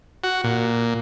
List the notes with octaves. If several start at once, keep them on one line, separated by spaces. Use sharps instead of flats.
F#4
A#2